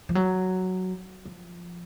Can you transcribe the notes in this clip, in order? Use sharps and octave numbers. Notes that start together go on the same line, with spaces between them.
F3
F#3
F3